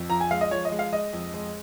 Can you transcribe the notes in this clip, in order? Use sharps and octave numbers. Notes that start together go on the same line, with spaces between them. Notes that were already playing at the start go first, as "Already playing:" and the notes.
Already playing: F2
F3 A#5
G#5
G#3 F5
D#5
F3 C#5
D#5
G#3
F5
G#3 D#5
F2
G#3